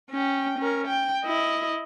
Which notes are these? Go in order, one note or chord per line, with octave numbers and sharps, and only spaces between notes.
C#4 G5
C#4 A#4
G5
E4 D#5